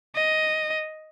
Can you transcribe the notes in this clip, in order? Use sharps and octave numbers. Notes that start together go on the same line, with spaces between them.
D#5